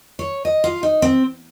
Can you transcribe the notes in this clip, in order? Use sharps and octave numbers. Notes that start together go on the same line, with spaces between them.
C#5
D#5
F4
D#4
C4